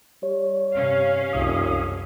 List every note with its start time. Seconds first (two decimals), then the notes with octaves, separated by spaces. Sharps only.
0.23 G3 C#5
0.75 G2 C3 C#4 F5
1.33 E1 C2 F#2 D#6